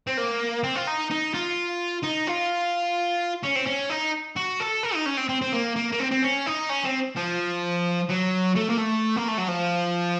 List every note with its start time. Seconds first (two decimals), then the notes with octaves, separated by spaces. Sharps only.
0.07 C4
0.17 A#3
0.64 C4
0.76 F4
0.87 D#4
1.10 D#4
1.34 F4
2.03 D#4
2.27 F4
3.43 C#4
3.55 C4
3.66 C#4
3.90 D#4
4.36 F#4
4.60 A4
4.83 A#4
4.95 D#4
5.06 C#4
5.17 C4
5.29 C4
5.41 C4
5.53 A#3
5.76 A#3
5.92 A#3
6.00 C4
6.11 C4
6.22 C#4
6.46 D#4
6.69 C#4
6.85 C4
7.16 F3
8.09 F#3
8.56 A3
8.70 A#3
8.78 A3
9.16 A#3
9.28 A3
9.38 F#3
9.48 F3